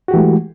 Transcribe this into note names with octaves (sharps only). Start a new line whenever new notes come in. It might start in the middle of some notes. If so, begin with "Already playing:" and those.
E3 G#3 A3 F#4 G4